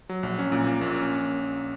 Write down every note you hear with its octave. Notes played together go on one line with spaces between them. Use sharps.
F#3
A#1
C#4
A#2
A#3
A#1
C#4